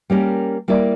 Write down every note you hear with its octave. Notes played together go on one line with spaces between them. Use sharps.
G3 A#3 C#4 G4 A#4
G3 A#3 E4 A#4 D5